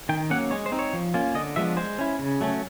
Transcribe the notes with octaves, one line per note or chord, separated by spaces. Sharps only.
D#3 G5
F#3 A#3 C#4 F#5
G#3 C#5
C5
C4 D#4
C#5
F3
A#3 C#4 F4
D3 D#5
F3 G#3 B3 D4 E5
G#3 C5
C#4 E4
C#3
F#3 A3 C#4